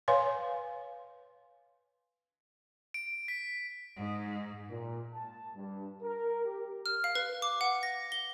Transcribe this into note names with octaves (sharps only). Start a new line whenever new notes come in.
B4 C#5 F5 G#5 C6
D7
B6
G#2
A#2
A5
G2
A#4
G4
F6
F5
B4
D6
F#5
A#6
G7